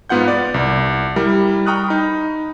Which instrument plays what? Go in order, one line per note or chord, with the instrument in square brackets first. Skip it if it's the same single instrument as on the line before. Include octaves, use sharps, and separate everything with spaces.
[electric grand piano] G#2 B3 F4 F#5 G6
D5
C2
G3 E4 A#4
G5 A#5 C#6 D#6 F6 F#6
D#4 B5